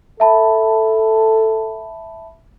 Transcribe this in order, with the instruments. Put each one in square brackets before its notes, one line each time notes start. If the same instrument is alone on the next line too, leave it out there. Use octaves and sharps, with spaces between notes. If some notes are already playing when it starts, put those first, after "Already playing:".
[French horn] A4 [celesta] E5 A5 B5